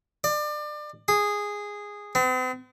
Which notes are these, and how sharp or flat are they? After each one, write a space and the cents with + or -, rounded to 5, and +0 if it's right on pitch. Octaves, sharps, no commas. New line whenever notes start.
D5 +30
G#4 -10
C4 -45